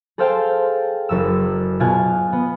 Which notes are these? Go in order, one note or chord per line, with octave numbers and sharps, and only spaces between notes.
G#4 A4 C5 F5 G5 A5
F#1 F#2 E6
B2 F4 G#5 F#6
B3